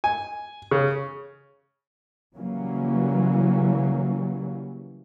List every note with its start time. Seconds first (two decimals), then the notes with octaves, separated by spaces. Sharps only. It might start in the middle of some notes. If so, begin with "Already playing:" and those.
0.04 G#5
0.71 C#3
2.36 C#3 E3 F#3 G3 A#3 C#4